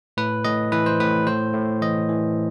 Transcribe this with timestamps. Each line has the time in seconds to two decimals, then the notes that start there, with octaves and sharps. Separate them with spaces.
0.17 A2 B4
0.45 A2 D#5
0.72 E3 B4
0.86 C5
1.00 A2 B4
1.27 A2 C5
1.54 A2
1.82 E3 D#5
2.09 E3